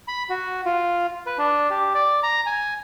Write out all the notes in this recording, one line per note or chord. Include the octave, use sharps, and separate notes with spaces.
B5
F#4
F4
B4
D4
G4
D5
A#5
G#5